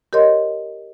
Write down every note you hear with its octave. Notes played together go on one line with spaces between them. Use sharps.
G4 A#4 C#5 D#5 C6